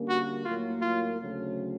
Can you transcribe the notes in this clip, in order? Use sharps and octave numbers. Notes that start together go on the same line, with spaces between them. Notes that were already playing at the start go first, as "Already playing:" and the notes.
Already playing: D3 G3 A#3 C#4
F#4
A2 F#3 A#3 F4
F4
D2 C#3 F#3 A3